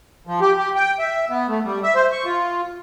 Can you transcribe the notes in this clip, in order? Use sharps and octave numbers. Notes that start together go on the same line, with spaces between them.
F3
G4
G4
G5
E5
B3
A3
G3
E5
C5
C#6
F4